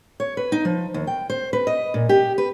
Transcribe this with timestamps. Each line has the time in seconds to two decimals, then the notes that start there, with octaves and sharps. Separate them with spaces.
0.20 C#5
0.37 B4
0.52 D#4
0.65 F3
0.94 D#2
1.07 G5
1.30 C5
1.53 B4
1.67 D#5
1.94 A#2
2.09 G4
2.38 B4